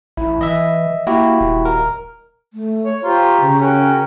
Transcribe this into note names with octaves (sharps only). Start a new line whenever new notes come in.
A1 E4
E3 D#5 E5
A#3 E4 F#4 G4
D#1
A#4
A3
C#5
F4 G4 C5 A#5 C#6
C#3
C#4 F#4 A#4 G5